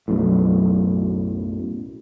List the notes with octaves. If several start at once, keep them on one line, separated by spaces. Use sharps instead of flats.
B1 F#2 A2